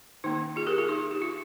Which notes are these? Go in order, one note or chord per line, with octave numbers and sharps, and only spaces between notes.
D#3 A#3 C#4 D#4
F4 G#4
G4 A#4
F4 G#4
D#4 G4
D#4 G4
F4